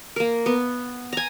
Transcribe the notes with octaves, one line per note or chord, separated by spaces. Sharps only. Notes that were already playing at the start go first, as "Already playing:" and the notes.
A#3 A#4
B3
G#5 A#5